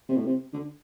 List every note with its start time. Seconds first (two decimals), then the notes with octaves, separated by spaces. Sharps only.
0.09 C3
0.16 A2
0.25 C3
0.53 D3